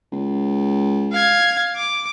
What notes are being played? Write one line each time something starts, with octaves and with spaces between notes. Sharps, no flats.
C#2
F5 G#6
D6